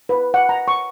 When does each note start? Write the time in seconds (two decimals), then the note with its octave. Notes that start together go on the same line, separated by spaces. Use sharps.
0.09 B4
0.34 F#5
0.49 A#5
0.68 C#6